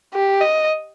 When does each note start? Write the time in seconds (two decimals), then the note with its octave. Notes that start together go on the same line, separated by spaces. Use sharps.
0.14 G4
0.41 D#5